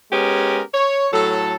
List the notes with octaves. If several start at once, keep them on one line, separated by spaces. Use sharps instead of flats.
G#3 B3 C#4 G4 A#4
C#5
A2 F#3 A4